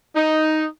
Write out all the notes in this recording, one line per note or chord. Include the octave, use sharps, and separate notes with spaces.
D#4